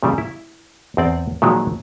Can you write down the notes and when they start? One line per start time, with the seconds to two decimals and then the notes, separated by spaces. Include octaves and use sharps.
0.03 A#2 C#3 G3
0.18 E4
0.97 E2 C4 D5
1.42 A#2 D#3 F3 F#3 G#3